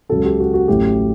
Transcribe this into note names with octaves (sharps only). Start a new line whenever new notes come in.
C#2 C#3 F#3 A4
G4
F#4
F#4
A1 A2 F#3 G4